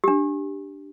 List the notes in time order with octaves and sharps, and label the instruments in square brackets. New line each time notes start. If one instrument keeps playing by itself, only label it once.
[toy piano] D4 G4